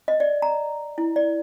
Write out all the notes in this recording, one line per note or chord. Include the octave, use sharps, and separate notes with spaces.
D#5
D5
A#5
E4
D5